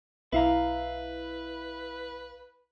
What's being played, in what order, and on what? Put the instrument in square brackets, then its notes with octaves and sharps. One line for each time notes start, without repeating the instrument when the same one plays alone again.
[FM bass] B1 [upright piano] E4 [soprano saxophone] B4 [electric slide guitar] E5 F5 A#5